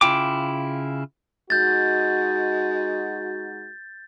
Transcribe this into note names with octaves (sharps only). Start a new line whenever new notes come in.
C#3 E4 F4 G5 D6
G#3 D#4 F#4 G6 A6